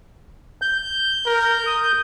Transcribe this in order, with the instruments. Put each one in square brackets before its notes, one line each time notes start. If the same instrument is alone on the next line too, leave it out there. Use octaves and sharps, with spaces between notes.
[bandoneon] G6
[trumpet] A#4
D#6